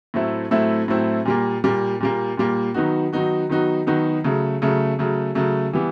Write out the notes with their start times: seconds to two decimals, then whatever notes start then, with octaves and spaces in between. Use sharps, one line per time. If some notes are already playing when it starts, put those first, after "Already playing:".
0.14 A2 F#3 A3 C4 E4
0.51 A2 F#3 A3 C4 E4
0.88 A2 F#3 A3 C4 E4
1.25 A#2 G3 A#3
1.64 A#2 G3 A#3
2.00 A#2 G3 A#3
2.37 A#2 G3 A#3
2.74 D#3 F#3 B3 D#4 F#4
3.13 D#3 F#3 B3 D#4 F#4
3.49 D#3 F#3 B3 D#4 F#4
3.87 D#3 F#3 B3 D#4 F#4
4.24 C#3 F#3 A3
4.62 C#3 F#3 A3
4.99 C#3 F#3 A3
5.35 C#3 F#3 A3
5.73 E3 G3 B3